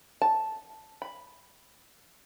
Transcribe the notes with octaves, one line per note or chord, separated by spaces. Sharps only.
A5
B5